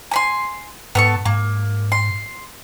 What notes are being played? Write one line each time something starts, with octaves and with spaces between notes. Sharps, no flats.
G#5 B5 C6
G#2 B3 A4 C#6
G#2 A#3
C6